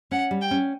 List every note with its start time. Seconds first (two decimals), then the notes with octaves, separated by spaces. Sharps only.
0.11 C#4 F#5
0.31 G3
0.42 G5
0.51 C#4